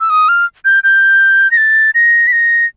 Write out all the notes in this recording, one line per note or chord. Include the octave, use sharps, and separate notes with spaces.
E6
D#6
F6
G6
G6
A#6
A6
A#6
B6
A#6